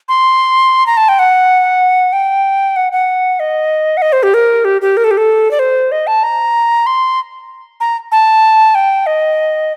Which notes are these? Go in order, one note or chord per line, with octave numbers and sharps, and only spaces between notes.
C6
A#5
A5
G5
F#5
G5
F#5
F#5
D#5
F#5
D#5
C5
G4
A#4
G4
G4
A#4
A4
G4
A4
D5
C5
D#5
A5
A#5
C6
A#5
A5
G5
D#5